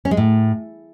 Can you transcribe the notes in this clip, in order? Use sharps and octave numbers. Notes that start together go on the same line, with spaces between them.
C#4
G#3
A2